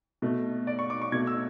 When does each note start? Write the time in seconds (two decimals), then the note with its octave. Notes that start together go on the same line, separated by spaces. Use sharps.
0.22 B2 A3
0.67 D5
0.79 C#6
0.90 D6
1.02 C#6
1.12 B2 A3 G#6
1.27 E6